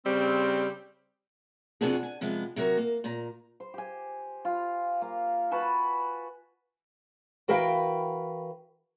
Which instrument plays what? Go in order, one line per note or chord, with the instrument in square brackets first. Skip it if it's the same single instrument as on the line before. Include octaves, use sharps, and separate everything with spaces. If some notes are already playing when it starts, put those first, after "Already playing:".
[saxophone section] C#3 G3 C4
[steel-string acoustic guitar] F2 C3 B3 D4 F#4 G#4
G#5
C3 F3 G#3 B3
C3 F#3 F#4 A#4
A#3
A#2 A#5
[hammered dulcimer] C5
G4 G#5
F4
A#3 F5
F#4 B4 G#5 A5
[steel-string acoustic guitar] E3 F#4 A#4 B4 F5 G5